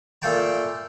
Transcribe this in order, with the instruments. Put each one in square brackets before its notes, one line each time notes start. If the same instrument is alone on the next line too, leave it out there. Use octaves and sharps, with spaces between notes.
[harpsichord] A#2 A3 F5 G5 A5